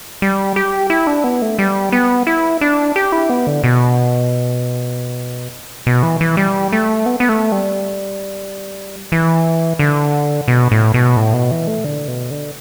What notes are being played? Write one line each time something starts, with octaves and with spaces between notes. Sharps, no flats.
G3
G4
E4
D4
B3
A3
G3
B3
E4
D4
G4
E4
B3
D3
B2
B2
E3
E3
G3
A3
B3
B3
A3
G3
E3
D3
B2
A2
B2
A2
B2
E3
A3
D3
B2
D3